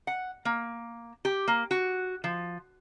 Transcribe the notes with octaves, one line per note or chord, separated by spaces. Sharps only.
F#5
A#3
G4
A#3
F#4
F3